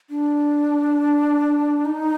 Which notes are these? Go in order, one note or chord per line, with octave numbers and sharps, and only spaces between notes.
D4
D#4